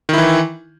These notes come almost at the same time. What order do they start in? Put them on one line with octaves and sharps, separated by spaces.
D#3 E4 E3